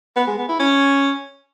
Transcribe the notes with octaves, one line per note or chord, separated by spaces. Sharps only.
B3
G#3
B3
E4
C#4